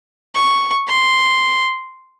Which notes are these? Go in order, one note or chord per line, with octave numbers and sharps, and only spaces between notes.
C#6
C6